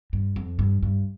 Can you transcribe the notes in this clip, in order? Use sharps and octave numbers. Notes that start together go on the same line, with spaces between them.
G2
F2
G2
G2